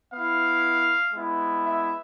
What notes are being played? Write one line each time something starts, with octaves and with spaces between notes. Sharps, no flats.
B3 E4 F5
G#3 B3 E4
E5